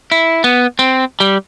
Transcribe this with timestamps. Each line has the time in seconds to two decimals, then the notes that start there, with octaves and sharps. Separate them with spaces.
0.12 E4
0.44 B3
0.79 C4
1.20 G3